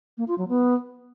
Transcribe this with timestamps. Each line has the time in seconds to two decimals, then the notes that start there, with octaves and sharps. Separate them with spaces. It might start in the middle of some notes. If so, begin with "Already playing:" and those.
0.18 A#3
0.28 F4
0.38 F#3
0.48 B3